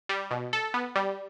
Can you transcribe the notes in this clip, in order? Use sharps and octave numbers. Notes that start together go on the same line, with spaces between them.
G3
B2
A4
B3
G3